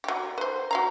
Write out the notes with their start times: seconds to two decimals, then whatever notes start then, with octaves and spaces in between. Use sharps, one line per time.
0.04 F#3 G4
0.38 B4 C5
0.71 F#4 F5 A#5